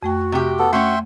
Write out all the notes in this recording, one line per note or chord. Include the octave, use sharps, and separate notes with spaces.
F2 A3 F#4 G5
C3 G4
B3 A4
A3 C#4 F#4 E5 G5 C6